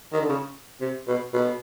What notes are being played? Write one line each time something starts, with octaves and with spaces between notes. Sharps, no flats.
D#3
D3
C#3
C3
B2
B2